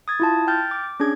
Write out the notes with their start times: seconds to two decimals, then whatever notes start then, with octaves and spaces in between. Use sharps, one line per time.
0.08 D#6 G#6 A6
0.20 E4 F4 A5
0.47 G5 F6 G6 A6
0.71 D6
1.00 C#4 D4 G#4 G#6